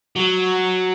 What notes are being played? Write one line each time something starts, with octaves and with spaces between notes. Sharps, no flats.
F#3